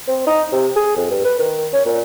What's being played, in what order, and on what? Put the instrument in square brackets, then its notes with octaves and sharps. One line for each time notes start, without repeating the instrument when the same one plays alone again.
[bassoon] C4
D#4
C3
G#4
F2
G2
B4
D#3
C#4
A#2